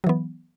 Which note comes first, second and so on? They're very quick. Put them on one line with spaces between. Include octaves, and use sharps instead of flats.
F#3 E3 B3